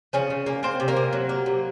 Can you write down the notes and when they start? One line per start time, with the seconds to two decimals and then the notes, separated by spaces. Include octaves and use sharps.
0.13 C#3 F3 C#4
0.30 C#3
0.46 A#3
0.63 A#3 C4 C5
0.80 C3
0.88 A#3 A#4
0.97 C3
1.13 F#3
1.29 A#3
1.46 C3